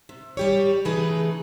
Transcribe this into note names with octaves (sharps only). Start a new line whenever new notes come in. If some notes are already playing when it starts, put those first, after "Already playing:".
C3
G3 G4 C#5
C#3 E3 A3 D#4 G#4 B4